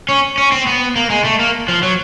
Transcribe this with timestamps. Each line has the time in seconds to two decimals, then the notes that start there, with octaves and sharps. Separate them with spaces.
0.09 C#4
0.38 C#4
0.52 C4
0.67 B3
0.96 A#3
1.10 G#3
1.24 A3
1.39 A#3
1.68 F3
1.83 F#3